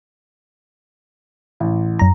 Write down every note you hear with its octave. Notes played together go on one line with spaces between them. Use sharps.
A1
F#2 A#5